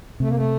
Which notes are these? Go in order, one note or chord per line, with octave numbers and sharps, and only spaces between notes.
C3 A3
A#3
A3